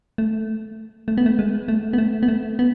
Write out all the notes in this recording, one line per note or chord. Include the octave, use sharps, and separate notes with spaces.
A3
A3
B3
A3
G#3
A3
B3
A3
B3
A3
B3